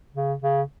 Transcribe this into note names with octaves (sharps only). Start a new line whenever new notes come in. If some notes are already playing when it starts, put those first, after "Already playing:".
C#3
C#3